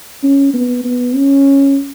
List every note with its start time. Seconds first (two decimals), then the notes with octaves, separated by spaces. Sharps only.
0.23 C#4
0.53 B3
0.84 B3
1.15 C#4